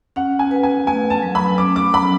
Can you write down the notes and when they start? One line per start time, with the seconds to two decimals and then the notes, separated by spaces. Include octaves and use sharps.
0.16 C#4 F#5
0.39 G#5
0.51 B4
0.63 G#5
0.87 A3 G#5
1.10 A5
1.22 F#3
1.35 B5
1.58 C#4 D6
1.76 D6
1.93 F#3 B5